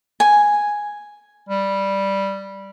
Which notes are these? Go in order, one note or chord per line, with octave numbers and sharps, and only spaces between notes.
G#5
G3